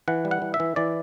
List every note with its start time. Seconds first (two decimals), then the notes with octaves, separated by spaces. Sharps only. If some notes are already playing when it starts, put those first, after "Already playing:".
0.08 E3 F#5
0.25 G3
0.31 F#5
0.42 E3
0.54 E5
0.60 E3
0.76 E3 D5